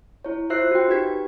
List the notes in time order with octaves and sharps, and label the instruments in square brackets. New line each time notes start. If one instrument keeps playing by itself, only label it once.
[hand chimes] E4 C#5
F4 C5 E5 E6 F#6 C7
F#4 G5
D#4 G4 G#4 B4 G#6 B6